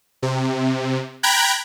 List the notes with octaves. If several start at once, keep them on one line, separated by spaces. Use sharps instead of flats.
C3
G5 A#5 B5 F#6 G#6